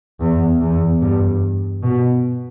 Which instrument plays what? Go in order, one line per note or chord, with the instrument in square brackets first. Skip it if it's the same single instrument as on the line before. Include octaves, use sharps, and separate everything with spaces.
[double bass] E2
E2
G2
B2